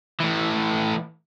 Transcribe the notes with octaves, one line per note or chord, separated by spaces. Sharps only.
A2 E3